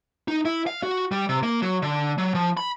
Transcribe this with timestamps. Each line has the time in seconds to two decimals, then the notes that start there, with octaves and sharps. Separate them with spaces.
0.28 D#4
0.45 E4
0.67 F5
0.83 F#4
1.12 G3
1.29 C3
1.43 A#3
1.62 F#3
1.82 D3
2.18 F#3
2.35 F3
2.57 B5